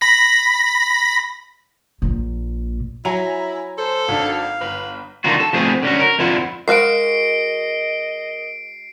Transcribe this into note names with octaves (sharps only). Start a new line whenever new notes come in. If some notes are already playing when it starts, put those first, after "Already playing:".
B5 A#6 B6
A#1 A#2
F#3 E4 G#5 A#5 F7
A4 C5
G#1 D4 F5
G1 B4
D3 D#3 D#4 F4 F#4
A4
F3 A3 B3 C4 G#4
D3 C#4 F#4
A#4
F2 D3 E4 F4 F#5
G#3 F#4 A#4 D#5 F5 C7 D7